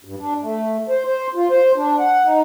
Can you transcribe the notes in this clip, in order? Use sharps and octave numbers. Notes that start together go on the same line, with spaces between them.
G2
D4
A3
C5
C5
F4
C5
D4
F#5
D#4